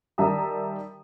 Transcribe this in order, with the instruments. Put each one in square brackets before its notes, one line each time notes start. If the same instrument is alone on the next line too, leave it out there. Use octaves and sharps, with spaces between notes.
[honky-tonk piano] D#3 G3 E5 A5 A#5 D#6